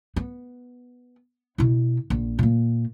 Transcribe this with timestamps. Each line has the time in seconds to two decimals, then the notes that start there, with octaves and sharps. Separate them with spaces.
0.16 B3
1.58 B2 E4
2.10 A#1
2.39 A#2 A#3